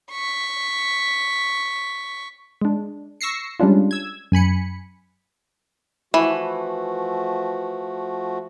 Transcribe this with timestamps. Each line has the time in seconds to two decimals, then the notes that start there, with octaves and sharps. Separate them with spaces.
0.11 C#6 B6
2.61 G#3 D4
3.21 C#6 E6 A#6 C7 C#7
3.60 G3 G#3 C#4 D4 F4
3.91 E6 G#6
4.32 F#2 G#5 B5 C#7
6.14 E3 F3 A3 F#4